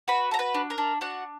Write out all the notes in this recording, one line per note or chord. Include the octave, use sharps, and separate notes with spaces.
F#4 B4 B5
A4 A#5
B4 B5
D4
A#4 A#5
D4
D4 F#4 F#5